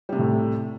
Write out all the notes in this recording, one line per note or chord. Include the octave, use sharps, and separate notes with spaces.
A2 C3 G3 A3